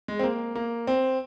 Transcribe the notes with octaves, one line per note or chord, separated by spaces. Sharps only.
G#3
C4
A#3
A#3
C4